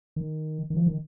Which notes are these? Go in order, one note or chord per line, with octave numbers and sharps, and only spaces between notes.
D#3
D#3
F3
D#3